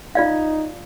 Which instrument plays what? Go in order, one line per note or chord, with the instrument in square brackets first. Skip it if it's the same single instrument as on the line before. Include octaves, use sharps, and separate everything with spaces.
[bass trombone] D#4 [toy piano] F4 D5 F5